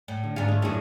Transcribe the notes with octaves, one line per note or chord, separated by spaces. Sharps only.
A2
D3
G#2 D4 F4 G#4
A3 C#4
F#2 A2 D4 G#4